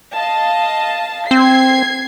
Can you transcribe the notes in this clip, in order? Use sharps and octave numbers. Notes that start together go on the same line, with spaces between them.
D#5 F5 A5
C4 G#6 C7